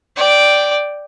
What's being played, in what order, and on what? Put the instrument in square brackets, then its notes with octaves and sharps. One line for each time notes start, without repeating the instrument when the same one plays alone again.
[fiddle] D5 G5